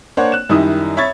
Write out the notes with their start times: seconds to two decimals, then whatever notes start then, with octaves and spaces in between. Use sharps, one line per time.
0.17 A#3 D4 C5 C#5 F#5
0.32 F#6 E7
0.49 F#2 D#3 G3 D#4 E4 D#6
0.97 C#5 E5 B5 C#6 G#6 A6